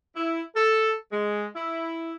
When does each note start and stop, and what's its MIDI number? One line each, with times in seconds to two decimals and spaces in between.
0.15 0.41 64
0.56 0.92 69
1.12 1.46 56
1.55 2.14 64